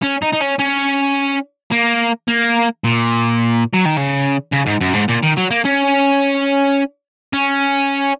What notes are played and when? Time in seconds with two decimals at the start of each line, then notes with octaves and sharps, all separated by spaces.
0.04 C#4
0.23 D#4
0.33 D#4
0.41 C#4
0.60 C#4
1.72 A#3
2.28 A#3
2.84 A#2
3.73 F#3
3.85 D#3
3.97 C#3
4.53 C#3
4.67 G#2
4.81 F#2
4.94 G#2
5.09 A#2
5.23 D#3
5.37 F#3
5.51 A#3
5.65 C#4
7.33 C#4